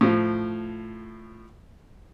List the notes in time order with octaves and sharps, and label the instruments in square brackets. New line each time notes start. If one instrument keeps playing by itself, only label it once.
[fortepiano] A2 F3